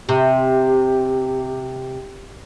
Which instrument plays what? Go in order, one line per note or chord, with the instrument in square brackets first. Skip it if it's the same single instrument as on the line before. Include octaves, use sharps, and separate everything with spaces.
[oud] C3 [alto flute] G4